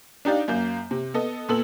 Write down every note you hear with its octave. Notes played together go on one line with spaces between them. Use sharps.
D4 D#4 G4 D5 F5
F#2 A#3 G6
C3
B3 A4 D#5
A#2 B3 A4 E6 F#7